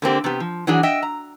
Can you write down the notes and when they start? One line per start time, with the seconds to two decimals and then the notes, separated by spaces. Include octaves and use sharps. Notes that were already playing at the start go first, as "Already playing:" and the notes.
0.02 D3 A#3 C4 G4
0.24 C3 B3 G4
0.40 F3
0.67 E3 F#3 D4 F#4 G#4
0.83 D#5 E5 G5
1.02 A#5